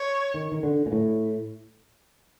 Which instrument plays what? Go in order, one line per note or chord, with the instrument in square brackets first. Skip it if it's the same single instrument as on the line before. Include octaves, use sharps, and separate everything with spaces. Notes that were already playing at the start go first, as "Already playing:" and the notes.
Already playing: [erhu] C#5
[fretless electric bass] D#3
D#3
D3
A#2
A2